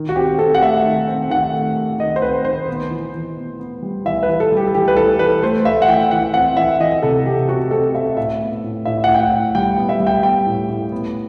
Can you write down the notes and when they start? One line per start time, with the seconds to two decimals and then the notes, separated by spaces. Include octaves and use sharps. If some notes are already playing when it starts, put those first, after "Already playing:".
Already playing: D#3
0.09 F#4
0.16 C4 G4
0.39 C4 A4
0.55 F#5
0.62 A3 E5
0.86 D#3
1.08 C4
1.30 D#3 F#5
1.53 A3
1.77 D#3
1.99 D#3 D#5
2.16 C5
2.22 C4 B4
2.45 D#3 C5
2.68 B3
2.90 E3
3.14 E3
3.37 B3
3.59 B3
3.82 G3
4.05 E3 E5
4.23 B4
4.28 E3
4.40 A4
4.52 G3 G4
4.67 A4
4.74 E3 G4
4.88 B4
4.96 E3 A4
5.19 E3 B4
5.42 A3 C5
5.65 A3 E5
5.82 F#5
5.88 E3 G5
6.11 E3 F#5
6.34 C4 F#5
6.57 E3 E5
6.80 E3 D#5
7.03 C3 A4
7.26 C4 G4
7.48 C4 F#4
7.71 C4 A4
7.95 C4 E5
8.17 A2 E5
8.41 B3
8.63 A2
8.85 A2 E5
9.04 F#5
9.08 A2
9.14 G5
9.20 F#5
9.32 A2
9.55 G3 G5
9.78 B3
9.89 E5
10.00 G3
10.07 G5
10.23 B3 G5
10.46 A2
10.69 A2
10.92 B3